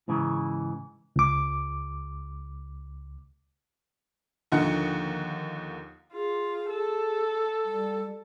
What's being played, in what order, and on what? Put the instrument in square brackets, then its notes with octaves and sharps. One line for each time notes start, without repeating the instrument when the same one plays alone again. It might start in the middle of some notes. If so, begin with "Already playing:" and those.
[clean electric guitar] G#2 C#3 E3
[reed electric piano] C#2 D6
[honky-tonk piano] D#2 D3 F3 D#4 F#5 C#7
[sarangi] F4 [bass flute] G#4
[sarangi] A4
[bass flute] G3